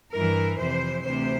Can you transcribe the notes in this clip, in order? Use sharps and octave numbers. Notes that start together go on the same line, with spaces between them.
G2 E3 A#4
F2 C3 E3 C5
D2 C3 E3 C5